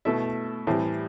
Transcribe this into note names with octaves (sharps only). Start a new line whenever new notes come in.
B2 A3 E4 A4 E5
A2 E3 G3 C4